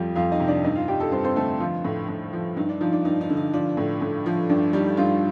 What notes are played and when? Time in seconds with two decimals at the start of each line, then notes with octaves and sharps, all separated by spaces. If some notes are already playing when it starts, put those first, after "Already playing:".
Already playing: F2 F3 G3
0.15 F2 F4 F5
0.32 D#4 D#5
0.40 C3
0.48 D4 D5
0.64 G2 D#4 D#5
0.76 F4 F5
0.88 G3 G4 G5
1.00 A4 A5
1.12 G2 C4 C5
1.24 C4 C5
1.36 D3 A3 A4
1.60 F3 F4
1.85 A2
2.09 A2
2.33 F3
2.57 G2 D#4
2.69 D4
2.81 F3 D#4
2.93 D4
3.05 G2 D#4
3.21 D#4
3.30 D3
3.37 D#4
3.53 F3 D4
3.77 A2
4.02 A2
4.26 F3
4.49 G2 D4
4.73 G3 D#4
4.97 G2 F3 F4